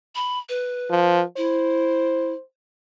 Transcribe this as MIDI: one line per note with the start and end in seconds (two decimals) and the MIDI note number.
0.15 0.39 83
0.49 1.24 71
0.90 1.23 53
1.37 2.33 64
1.37 2.42 72